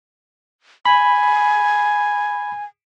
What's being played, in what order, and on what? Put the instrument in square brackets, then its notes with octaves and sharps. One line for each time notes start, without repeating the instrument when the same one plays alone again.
[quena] G#5 [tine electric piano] B5